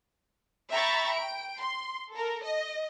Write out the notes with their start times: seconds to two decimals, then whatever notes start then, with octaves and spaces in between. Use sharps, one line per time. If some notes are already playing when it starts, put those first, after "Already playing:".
0.71 E5 G5 A#5 B5 C#6 A6
1.13 G5 D7
1.58 C6
2.11 A4 A#4
2.43 D#5